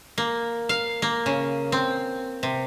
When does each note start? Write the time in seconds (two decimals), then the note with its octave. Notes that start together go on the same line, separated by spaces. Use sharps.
0.18 A#3
0.69 F5
1.02 A#3
1.26 C#3
1.72 C4
2.43 C3